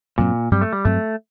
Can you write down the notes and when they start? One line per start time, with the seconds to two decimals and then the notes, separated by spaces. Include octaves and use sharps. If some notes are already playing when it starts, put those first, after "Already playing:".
0.18 G2 A#2 F#3 C4
0.51 G2 F#3 G3 C4
0.61 A3
0.73 G3
0.85 G2 F#3 A3 C4